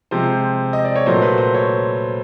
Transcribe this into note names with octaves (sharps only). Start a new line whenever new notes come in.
C3 F3 G#3 C5
D#5
D5
C#5
A#2 F#3 A3 C5
B4
C5
C#5